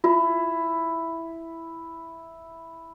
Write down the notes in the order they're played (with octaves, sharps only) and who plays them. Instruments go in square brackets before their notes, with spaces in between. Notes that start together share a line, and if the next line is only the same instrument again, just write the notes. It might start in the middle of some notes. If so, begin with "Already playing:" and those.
[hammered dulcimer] E4 [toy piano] F4